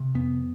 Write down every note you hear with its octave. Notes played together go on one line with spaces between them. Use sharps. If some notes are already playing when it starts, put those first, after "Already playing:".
Already playing: C3
F2 B3